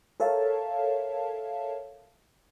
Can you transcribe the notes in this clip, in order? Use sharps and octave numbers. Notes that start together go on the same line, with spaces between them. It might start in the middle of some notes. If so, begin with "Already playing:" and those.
A4 A#4 C#5 E5 F5 A5